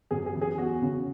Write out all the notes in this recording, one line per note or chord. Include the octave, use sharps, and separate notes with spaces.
F#2 G#4
G#4
E3
G#4
E2 F#4
C#3